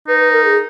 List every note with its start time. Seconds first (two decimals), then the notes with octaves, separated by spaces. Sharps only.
0.08 D#4 B4
0.20 B4
0.32 A#4
0.44 G#4